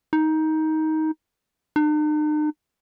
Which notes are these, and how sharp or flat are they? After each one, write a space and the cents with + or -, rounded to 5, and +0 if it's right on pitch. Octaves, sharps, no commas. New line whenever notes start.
D#4 +15
D#4 -45